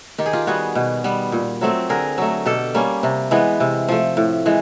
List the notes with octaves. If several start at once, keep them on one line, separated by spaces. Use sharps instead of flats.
D#3 G4
G#4
F4 G4
G3 B3 F#4 G#4
B2
G3 B3
A#2
F#3 A3 C4
D3 G#4 A#4
F#3 A3
B2 G4 A4
G3 A#3 C#4
C3
E3 G#3 B3
C3
F3 A3
A2
E3 G#3